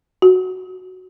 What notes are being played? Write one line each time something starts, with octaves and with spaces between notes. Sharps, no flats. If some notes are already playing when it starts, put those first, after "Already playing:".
F#4